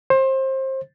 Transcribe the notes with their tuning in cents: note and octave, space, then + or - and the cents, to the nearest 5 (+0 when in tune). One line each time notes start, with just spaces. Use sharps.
C5 +25